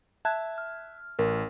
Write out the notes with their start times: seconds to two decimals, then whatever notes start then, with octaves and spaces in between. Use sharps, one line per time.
0.25 E5 A5 F#6 G#6
0.58 F6
1.19 A1 A#4